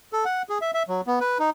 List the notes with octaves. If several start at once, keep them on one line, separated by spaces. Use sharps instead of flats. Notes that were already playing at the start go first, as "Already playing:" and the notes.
A4
F#5
G#4
E5
E5
F#3
B3
B4
D#4